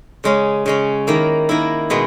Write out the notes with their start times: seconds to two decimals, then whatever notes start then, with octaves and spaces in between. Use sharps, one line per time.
0.24 C#3 G#3 C#4
0.66 C#3 G#3 C#4
1.07 D#3 A#3 E4
1.49 D#3 A#3 E4
1.90 B2 G#3 B3